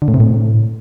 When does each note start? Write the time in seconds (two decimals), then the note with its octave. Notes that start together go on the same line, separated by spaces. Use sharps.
0.02 D3
0.08 A2
0.14 C3
0.20 A2